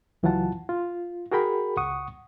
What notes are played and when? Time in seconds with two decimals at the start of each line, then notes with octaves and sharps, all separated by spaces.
0.23 C#2 E3 F#3 F4 F#5 A5
0.69 F4
1.32 F#4 G#4 A#4 G5 B5
1.77 C#2 F#5 C#6 D#6